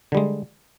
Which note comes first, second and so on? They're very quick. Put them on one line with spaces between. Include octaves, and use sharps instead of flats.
D3 G3 G#3